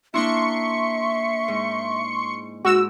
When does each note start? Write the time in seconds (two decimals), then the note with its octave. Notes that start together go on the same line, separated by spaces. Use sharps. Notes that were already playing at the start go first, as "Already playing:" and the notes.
0.14 A#3 D4 E4 E5 C6 C#6 C#7
1.48 G#2
2.65 G#2 F#4 E6